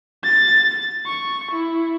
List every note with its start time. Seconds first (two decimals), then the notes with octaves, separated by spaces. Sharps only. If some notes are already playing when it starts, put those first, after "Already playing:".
0.24 A6
1.06 C#6
1.52 E4